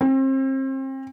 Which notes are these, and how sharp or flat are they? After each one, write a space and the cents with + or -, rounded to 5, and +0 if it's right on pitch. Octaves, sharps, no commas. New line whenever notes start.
C4 +35